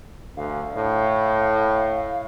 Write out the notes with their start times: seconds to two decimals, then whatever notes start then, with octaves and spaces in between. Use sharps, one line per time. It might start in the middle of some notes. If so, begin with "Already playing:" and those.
0.37 D2 F5
0.77 A2